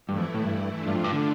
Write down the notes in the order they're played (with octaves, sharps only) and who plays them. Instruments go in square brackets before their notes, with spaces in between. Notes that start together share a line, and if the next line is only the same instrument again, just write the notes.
[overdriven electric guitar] G2 [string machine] E3 A3 E4
[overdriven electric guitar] F2
A2
G2
[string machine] A3 D4 F4
[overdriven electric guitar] G2
F2
G2
D3